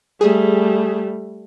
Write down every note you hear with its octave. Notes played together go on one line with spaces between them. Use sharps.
G3 A3 G#4